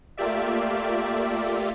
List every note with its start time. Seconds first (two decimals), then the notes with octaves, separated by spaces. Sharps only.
0.18 A3 A#3 F4 G4 D5 E5